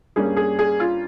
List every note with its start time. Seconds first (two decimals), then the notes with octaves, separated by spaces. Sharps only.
0.16 G2 G3 A#3 C#4 G#4
0.37 G#4
0.59 G#4
0.80 F4